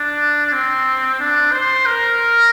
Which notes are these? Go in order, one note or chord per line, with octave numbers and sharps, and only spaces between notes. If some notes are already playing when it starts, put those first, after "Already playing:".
Already playing: D4
C4
D4
C5
A#4